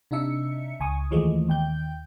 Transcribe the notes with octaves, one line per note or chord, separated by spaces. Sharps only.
C3 D4 D#4 E5 C#7
C#2 G#5 C#6 D#6
D#2 E3 F3 G#3 A3 D#5
D#2 G5 G6